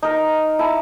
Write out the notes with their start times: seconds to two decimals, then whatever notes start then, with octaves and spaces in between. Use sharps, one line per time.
0.02 D#4 A#4
0.59 E4 A5 B5